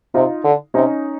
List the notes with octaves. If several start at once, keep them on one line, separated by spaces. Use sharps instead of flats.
C3 D#4 F4
D3
C3 C#4 D#4